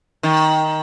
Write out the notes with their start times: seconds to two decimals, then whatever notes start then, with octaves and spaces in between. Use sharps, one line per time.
0.23 D#3